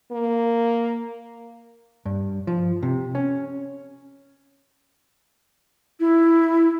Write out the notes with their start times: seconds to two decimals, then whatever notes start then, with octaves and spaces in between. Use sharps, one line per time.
0.12 A#3
2.05 G2
2.47 F3
2.83 C3
3.15 C#4
6.00 E4